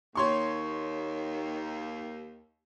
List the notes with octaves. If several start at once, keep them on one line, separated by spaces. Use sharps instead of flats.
D#2 C#5 C6 C#6